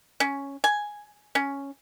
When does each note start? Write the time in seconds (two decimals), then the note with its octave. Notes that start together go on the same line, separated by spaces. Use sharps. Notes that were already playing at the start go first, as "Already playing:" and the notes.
0.20 C#4
0.64 G#5
1.35 C#4